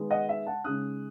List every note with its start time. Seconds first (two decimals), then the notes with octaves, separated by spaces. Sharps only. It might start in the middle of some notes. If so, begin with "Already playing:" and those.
Already playing: D#3 G#3 B3 D#4
0.10 D#5 F#5
0.29 E5
0.46 F#5 A5
0.64 C#3 G#3 D#4 D#6 F#6